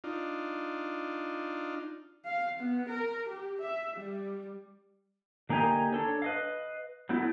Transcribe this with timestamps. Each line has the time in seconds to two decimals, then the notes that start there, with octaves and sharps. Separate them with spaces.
0.04 D4 D#4 F4
2.25 F5
2.59 B3
2.89 A#4
3.29 G4
3.61 E5
3.96 G3
5.49 D3 A#3 D#4 G4 G#5 A#5
5.93 D4 A4 C#5
6.22 B4 D#5 F5
7.09 F#3 A3 B3 E4